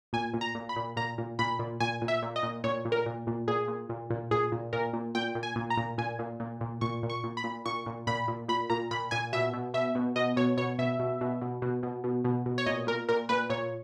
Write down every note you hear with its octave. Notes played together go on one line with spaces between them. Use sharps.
A#2 G#5
A#2
A#5
A#2
B5
A#2
A#2 A#5
A#2
A#2 B5
A#2
A#2 G#5
A#2
E5
A#2
D#5
A#2
A#2 C#5
A#2
A#4
A#2
A#2
A#2 G#4
A#2
A#2
A#2
A#2 G#4
A#2
A#2 A#4
A#2
A#2 G5
A#2
G#5
A#2
A#5
A#2
A#2 G#5
A#2
A#2
A#2
A#2 C#6
A#2
C#6
A#2
B5
A#2
A#2 C#6
A#2
A#2 B5
A#2
A#2 B5
A#2 A#5
A#2 B5
A#2 G#5
B2 E5
B2
B2 E5
B2
B2 D#5
B2 C#5
B2 C#5
B2 E5
B2
B2
B2
B2
B2
B2
B2
B2
C#5
A#2 D#5
A#2 A#4
A#2 A#4
A#2 B4
A#2 C#5